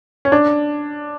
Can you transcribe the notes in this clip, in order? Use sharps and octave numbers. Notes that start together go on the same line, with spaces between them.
C#4
D4